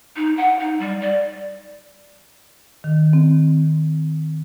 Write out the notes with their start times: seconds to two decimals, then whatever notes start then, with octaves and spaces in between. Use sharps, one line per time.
0.16 D#4
0.37 F#5
0.60 D#4
0.79 G3
1.01 D5
2.84 D#3
3.13 C4